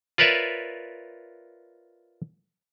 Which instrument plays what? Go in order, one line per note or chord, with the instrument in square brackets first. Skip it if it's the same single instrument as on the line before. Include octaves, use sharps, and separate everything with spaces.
[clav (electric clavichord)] F4 A#4 B4 C#5 D5 E5